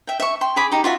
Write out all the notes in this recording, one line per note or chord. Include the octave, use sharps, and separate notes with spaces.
E5 G5
E5 C#6
G5 C6
G#4 G#5 B5 D6
D#4 G4
F4 F#4 E5 C6